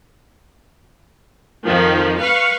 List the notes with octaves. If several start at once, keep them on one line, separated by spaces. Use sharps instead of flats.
F2 D#3 F3
B4 F5 C#6